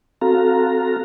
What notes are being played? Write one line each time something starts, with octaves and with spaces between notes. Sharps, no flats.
C4 F#4 A4 F5 A#5